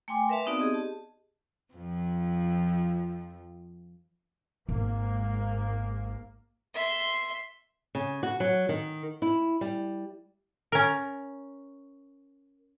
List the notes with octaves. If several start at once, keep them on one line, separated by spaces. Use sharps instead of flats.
A3 G5 G#5 C6 D6
A#4 B4 E5 F5 A5
B3 C4 D#4 F#4 D5
G4 G#4 D#5
A5
F2 F3
G#1 G#2 A#3
E5 C6
C#3
F#4
F#3
D#3
E4
G3
C#4 A#4